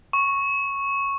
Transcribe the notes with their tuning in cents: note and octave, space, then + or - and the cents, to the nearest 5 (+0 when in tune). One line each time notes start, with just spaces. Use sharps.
C#6 -5